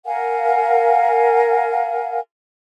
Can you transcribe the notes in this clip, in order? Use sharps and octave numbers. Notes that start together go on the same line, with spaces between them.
A#4 F5 F#5 G#5